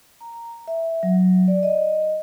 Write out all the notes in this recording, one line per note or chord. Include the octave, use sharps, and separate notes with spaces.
A#5
E5
F#3
D5
D#5